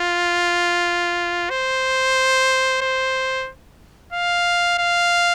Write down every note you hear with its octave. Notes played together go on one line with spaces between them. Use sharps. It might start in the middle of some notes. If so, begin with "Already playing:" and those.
Already playing: F4
C5
C5
F5
F5